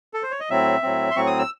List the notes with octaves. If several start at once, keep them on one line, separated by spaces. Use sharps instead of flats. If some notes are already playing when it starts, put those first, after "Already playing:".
A4
C5
C#5
D#5
A2 F#3 C4 E5
A2 F#3 C4
C6
A2 F#3 C4 C#6
D#6
E6